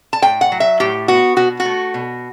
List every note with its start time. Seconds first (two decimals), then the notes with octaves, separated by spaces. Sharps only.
0.13 A5
0.22 A2 G5
0.41 F#5
0.52 F#3
0.60 E5
0.80 A2 G4
1.08 B3 F#4
1.36 B2 F#4
1.60 F#4
1.65 A3
1.94 B2